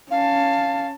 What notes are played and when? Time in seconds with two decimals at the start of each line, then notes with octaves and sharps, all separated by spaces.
0.10 C#4 F5 A5